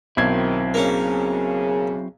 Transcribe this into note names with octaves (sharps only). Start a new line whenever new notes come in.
B1 D#3 F#3 C4 E4 G#6
C#3 A#3 C#4 G#4